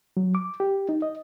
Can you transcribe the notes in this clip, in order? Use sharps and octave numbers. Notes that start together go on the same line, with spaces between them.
F#3
D6
G4
D#4
D#5